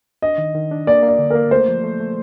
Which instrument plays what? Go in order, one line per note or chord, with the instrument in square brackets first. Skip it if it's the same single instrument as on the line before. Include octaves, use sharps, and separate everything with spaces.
[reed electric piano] D4 [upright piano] D#5
[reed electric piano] D#3
D#3
D4
[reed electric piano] A#3 [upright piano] D5
[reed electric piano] A#3
[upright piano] D5
[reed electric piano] D3
[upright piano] A#4
[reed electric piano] A#3
[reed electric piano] A3 [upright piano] C5
[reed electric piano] F3
A3
A3